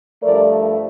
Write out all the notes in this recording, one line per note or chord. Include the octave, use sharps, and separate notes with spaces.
G2 F3 A3 A#4 D5